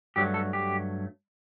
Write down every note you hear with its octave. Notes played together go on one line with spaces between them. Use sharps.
G2 F#3 A3 G4
A4
G4